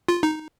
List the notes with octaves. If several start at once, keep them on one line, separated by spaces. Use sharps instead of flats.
F4
D#4